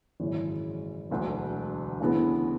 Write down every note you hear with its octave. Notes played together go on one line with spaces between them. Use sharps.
G#1 F#2 C#3 E3 G#3
E1 D2 D3 F#3
D2 C#3 E3 B3